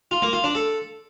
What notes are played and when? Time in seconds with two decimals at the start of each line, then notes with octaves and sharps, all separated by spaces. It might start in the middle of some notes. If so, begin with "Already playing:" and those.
0.11 F4
0.22 A#3
0.33 F4
0.44 D4
0.55 A4